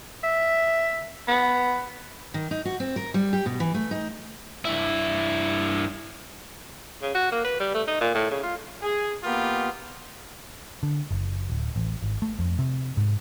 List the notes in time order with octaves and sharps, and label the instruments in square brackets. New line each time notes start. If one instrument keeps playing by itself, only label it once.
[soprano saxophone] E5
B3
[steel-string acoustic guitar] D#3
D#4
F#4
C4
A#4
G3
G4
B2
E3
A3
D#4
[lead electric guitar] G2 E4
[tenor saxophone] C#3
F#4
A#3
B4
G3
A3
D#4
A#2
A2
C#3
F4
[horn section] G#4
A#3 B3 F4 G4
[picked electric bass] D3
F#1
D1
A1
G#1
A3
F2
C3
G#2